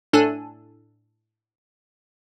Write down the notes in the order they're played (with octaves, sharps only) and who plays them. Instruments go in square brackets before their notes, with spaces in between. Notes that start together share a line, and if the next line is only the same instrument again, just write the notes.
[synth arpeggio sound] A2 D4 A4 G#5 D#7